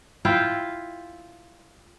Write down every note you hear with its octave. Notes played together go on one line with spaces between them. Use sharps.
E4 F4 F5 G5